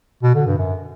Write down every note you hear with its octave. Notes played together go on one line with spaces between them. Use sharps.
B2
D3
G2
F#2